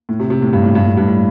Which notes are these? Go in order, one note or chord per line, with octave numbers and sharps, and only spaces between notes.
A2
C3
C3
A2
G2
A2
G2
A2
G2
A2